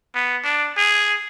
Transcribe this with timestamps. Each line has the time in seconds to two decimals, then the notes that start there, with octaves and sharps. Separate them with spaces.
0.15 B3
0.44 D4
0.77 G#4